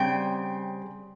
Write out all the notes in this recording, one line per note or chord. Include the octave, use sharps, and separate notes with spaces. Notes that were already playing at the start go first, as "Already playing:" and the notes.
Already playing: C#3 G3 C4 G5